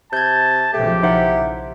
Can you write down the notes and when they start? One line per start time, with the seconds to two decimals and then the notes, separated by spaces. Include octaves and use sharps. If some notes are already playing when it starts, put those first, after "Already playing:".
0.13 C3 A5 G6 G#6
0.74 B1 C#3 F3 A3 G4
1.03 D#4 E4 C5 F#5